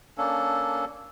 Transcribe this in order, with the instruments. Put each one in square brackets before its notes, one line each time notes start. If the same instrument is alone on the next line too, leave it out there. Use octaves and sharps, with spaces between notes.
[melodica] A#3 C#4 D4 A4